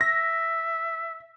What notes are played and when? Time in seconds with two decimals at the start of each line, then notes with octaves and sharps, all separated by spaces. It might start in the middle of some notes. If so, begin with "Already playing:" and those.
0.01 E5 A#6